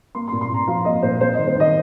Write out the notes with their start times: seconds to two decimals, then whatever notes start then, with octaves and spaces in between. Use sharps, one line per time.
0.15 A#3 C6
0.28 C6
0.32 A#2
0.41 C6
0.50 A#2 A#5
0.67 F3 F5
0.85 A#3 D#5
1.03 A#2 C5
1.21 A#3 C5
1.34 D#3 D#5
1.47 C5
1.56 D#3 D#5